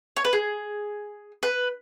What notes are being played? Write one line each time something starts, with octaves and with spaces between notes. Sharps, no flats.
C#5
B4
G#4
B4